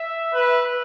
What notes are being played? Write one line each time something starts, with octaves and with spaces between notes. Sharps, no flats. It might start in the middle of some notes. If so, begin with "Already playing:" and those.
Already playing: E5
B4